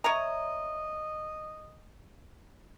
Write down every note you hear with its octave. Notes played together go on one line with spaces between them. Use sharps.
C#5 D#5 E5 A#5